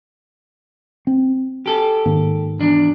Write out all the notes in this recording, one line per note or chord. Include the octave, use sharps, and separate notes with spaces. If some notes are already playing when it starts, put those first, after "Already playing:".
C4
G4 A4
G#2 D#3 A#3
E2 D4